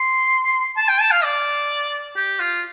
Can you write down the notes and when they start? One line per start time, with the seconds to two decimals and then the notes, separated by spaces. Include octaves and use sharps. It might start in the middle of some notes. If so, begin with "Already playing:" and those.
Already playing: C6
0.77 A5
0.88 G5
1.00 A5
1.11 F5
1.23 D5
2.16 G4
2.40 F4